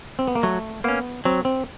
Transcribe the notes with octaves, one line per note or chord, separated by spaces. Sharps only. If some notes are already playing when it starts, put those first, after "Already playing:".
C4
B3
A#3
F#3 A3
A#3 B3 C#4
F#3 C4
C4